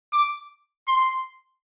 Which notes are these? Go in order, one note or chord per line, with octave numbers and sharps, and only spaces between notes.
D6
C6